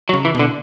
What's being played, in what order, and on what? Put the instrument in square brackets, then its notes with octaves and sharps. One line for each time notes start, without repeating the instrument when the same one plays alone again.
[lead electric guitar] F#3
[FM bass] C#3
[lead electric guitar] E3
[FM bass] B2 [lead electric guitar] D3